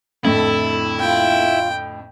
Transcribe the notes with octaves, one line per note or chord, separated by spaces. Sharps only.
F2 A2 D3 E4 A4
F4 G5